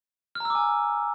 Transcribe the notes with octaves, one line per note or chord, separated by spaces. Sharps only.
G#5 A#5 D6 E6 F6